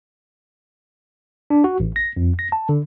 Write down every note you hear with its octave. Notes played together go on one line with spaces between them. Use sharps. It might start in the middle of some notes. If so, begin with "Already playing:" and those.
D4
F#4
A1
A#6
F2
A#6
A5
D3